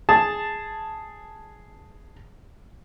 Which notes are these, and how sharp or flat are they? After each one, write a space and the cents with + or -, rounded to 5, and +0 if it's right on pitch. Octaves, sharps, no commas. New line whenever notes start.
G#4 +0 A5 +0